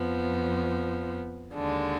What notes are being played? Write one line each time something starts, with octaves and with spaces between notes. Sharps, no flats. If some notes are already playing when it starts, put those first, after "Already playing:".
Already playing: F2 F3 B3
D#2 D3 G#3 D4